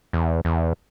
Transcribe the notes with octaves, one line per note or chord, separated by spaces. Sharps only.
E2
E2